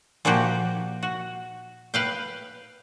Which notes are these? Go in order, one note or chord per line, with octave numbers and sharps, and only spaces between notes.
A#2 F3 A#3 F#4 G4
F#4
B4 F5 G5